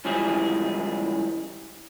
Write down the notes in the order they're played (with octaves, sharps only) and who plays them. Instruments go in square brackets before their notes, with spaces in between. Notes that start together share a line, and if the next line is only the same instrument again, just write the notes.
[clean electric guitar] C#2 E3 F3 G3 E4 G#4